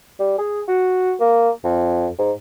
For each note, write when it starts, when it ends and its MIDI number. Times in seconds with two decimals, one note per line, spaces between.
0.19 0.34 55
0.38 0.62 68
0.67 1.13 66
1.20 1.50 58
1.64 2.08 41
2.18 2.31 44